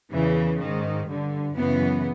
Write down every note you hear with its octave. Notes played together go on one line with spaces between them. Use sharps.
E2 C#3 E3
G#2 D#3
G2 D3
F#2 C#3 E3 B3